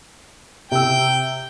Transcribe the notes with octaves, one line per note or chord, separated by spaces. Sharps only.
C3 G5 E6